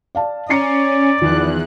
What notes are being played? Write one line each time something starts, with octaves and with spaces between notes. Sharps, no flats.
D5 F5 A5
C#4 D5 A#5 C7 C#7
E2 D#3 F3 F#6